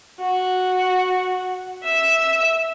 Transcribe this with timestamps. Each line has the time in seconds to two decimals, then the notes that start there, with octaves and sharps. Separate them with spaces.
0.20 F#4
1.84 E5 E6